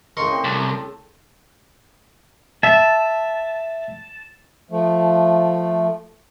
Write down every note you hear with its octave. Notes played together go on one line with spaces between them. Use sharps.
A2 C#3 A#4 D#5 C6 C#6
C4
C2 A5
E5 A5
F3 A3